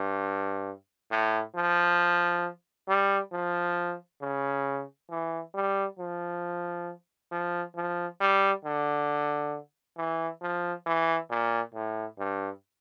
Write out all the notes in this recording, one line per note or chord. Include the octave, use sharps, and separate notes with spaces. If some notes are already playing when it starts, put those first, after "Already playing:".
Already playing: G2
A2
F3
G3
F3
C#3
E3
G3
F3
F3
F3
G3
D3
E3
F3
E3
A#2
A2
G2